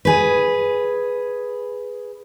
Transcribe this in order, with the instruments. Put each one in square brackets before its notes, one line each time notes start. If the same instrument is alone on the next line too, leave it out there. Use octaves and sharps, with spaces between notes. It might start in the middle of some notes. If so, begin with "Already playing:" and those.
[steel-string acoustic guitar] G#4 B4